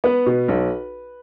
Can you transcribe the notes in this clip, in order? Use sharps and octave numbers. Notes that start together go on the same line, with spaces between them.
B3 B4
B2
B1